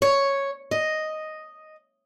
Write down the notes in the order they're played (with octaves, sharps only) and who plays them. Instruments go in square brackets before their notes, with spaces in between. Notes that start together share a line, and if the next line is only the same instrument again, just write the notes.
[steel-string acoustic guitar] C#5
D#5